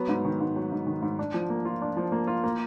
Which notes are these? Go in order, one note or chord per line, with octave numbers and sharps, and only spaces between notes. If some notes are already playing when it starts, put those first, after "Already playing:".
Already playing: F#3 B3
G#2
D#3
G#2
F#3
G#2
D#3
G#2
D4
F3
A#3
F4
D4
F3
A#3
F4
A#3